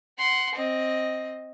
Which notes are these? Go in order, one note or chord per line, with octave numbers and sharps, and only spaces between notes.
F#5 C6
C4 D#5